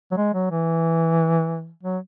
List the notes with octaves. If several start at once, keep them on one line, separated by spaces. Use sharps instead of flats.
F#3
G#3
F#3
E3
F#3